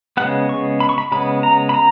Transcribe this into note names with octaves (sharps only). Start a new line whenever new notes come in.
C#3 G#3 B3 F#5
C#6
B5
C#6
B5
C#3 G#3 B3 B5
A#5
B5
A#5